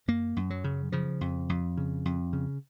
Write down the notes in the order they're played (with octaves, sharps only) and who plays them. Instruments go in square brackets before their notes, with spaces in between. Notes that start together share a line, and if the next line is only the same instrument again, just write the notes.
[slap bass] F#2 A#3
F#2
F#3
C#3
C#3 F3
F2
F2
C#3
F2
C#3